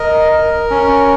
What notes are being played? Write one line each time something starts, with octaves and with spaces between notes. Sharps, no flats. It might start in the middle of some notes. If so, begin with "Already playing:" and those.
Already playing: A#4 D#5
A#4
C#4